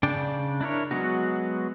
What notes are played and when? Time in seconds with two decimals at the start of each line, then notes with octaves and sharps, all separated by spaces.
0.03 C#3 D4 D5 G5
0.61 D4 E4 A#4 C#5
0.91 F#3 G#3 B3 F#4